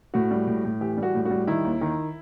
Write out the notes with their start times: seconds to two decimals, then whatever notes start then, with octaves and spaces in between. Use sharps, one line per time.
0.14 A2 F#4
0.31 G3
0.47 A2
0.64 A2
0.80 E3 G4
0.97 G3
1.03 F#4
1.15 A2
1.25 F#4
1.31 G3
1.47 D#3 E4
1.64 D#2
1.81 D#3